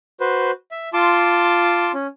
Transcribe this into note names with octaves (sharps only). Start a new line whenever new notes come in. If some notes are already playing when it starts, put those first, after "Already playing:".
F#4 B4 C5
E5
F4 A5 C6 D6
C#4